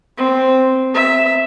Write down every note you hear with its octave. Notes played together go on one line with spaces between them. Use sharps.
C4
E5